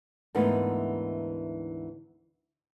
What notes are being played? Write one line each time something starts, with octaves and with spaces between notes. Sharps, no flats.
D2 G#2 E3 A#3 B3 D#4